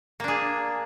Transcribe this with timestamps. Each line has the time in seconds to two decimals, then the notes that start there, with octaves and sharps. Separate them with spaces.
0.20 A#3
0.24 D4
0.28 G#4